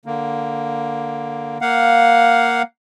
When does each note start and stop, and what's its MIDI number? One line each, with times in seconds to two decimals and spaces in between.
0.06 1.58 50
0.06 1.58 58
1.61 2.62 58
1.61 2.62 77
1.61 2.62 78